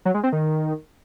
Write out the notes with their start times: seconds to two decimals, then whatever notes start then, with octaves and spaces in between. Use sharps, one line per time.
0.05 F#3
0.14 G#3
0.23 C4
0.33 D#3